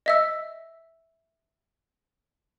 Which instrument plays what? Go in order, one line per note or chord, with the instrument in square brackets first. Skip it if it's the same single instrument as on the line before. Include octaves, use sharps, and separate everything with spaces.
[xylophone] D#5 E5 E6